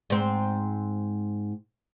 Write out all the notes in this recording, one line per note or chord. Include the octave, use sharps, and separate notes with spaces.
G#2 C4